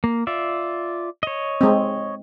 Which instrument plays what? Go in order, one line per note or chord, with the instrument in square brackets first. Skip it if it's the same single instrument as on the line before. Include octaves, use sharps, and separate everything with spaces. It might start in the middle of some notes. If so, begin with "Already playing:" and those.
[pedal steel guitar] A#3
F4 D5 E5
C#5 D#5
[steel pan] G#3 C4